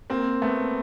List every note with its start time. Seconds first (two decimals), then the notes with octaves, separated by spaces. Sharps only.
0.10 A#3 C4
0.42 A3 B3